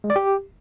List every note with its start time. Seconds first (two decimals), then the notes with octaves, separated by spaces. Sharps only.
0.04 G#3
0.10 D5
0.16 G4